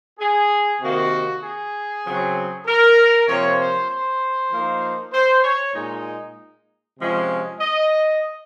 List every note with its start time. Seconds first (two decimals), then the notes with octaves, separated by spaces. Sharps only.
0.19 G#4
0.80 C3 D#3 A#3 F#4
1.43 G#4
2.04 C#3 F#3 C4
2.66 A#4
3.27 C3 F3 A#3 C#5
3.58 C5
3.89 C5
4.51 F3 A#3 D#4
5.13 C5
5.44 C#5
5.74 A#2 G#3 D#4
6.98 C3 F3 G#3 C#4
7.60 D#5